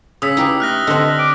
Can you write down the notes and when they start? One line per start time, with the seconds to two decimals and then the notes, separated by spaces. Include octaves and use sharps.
0.22 C#3 D#6 E6 B6
0.37 D#4 E4 G4 B4
0.60 A3 F6 F#6 A#6
0.87 D3 C4 D#5 E6
1.19 D6